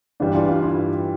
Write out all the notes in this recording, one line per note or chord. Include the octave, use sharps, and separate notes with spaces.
G2 E3 G3 D4
F4
F4
E4